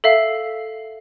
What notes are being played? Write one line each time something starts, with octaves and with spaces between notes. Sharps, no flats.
A4 E5 F5